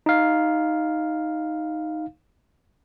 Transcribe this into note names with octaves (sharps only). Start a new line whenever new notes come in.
D#4 F5